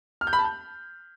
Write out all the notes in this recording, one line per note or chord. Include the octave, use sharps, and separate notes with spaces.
F6
G6
B5
A5
G6